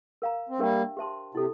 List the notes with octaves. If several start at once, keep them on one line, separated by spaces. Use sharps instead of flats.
A#4 F5 A#5
C4
G3 A#3 D4 G4 A#4 E5 G5
G4 C5 E5 A5 C6
C3 E4 A4